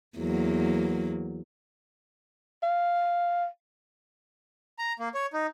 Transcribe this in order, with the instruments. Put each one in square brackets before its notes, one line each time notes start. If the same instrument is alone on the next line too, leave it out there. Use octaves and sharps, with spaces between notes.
[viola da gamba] E2 F#3 A#3
[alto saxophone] F5
[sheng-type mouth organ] A#5
A#3
C#5
D#4